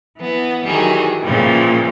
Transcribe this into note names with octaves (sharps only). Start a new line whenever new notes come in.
E3 B3
D#3 E3 F#3 G3 G#4
A#2 C#3 E3 F3 G3